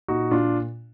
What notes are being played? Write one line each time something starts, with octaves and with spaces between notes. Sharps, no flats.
A#2 D#4 F#4
A#2 D4 F4